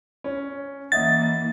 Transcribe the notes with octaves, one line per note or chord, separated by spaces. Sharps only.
C#4
E3 A#3 D#5 E5 F#5 A6